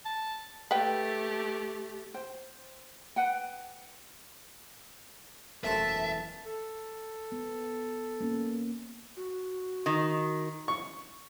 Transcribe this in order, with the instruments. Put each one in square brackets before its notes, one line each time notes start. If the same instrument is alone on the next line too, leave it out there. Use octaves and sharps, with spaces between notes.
[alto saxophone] A5
[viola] A3 G4 [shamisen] B4 G5
[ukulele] C5 G5
B4 F#5 G5
[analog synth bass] E1 [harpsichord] F#2 A3 C5 [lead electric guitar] E5 [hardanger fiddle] A5
[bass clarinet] A4
[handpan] B3
A#3 C#4
[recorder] F#4
[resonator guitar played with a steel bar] D#3
[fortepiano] C#6